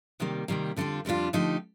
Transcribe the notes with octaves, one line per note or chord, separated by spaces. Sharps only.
C3 D#3 G3 A#3
C3 D#3 G3 A#3
F2 D3 G3 D4 F4
F2 D3 G3 D4 F4
D3 F3 A3 D#4 G4